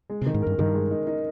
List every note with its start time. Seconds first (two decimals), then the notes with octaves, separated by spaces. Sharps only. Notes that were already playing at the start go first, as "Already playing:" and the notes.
0.10 G#3
0.22 C3
0.26 D#3
0.34 G#2
0.42 G2 A#4
0.59 G2 D#3
0.74 G#3
0.91 D#4
1.07 D#4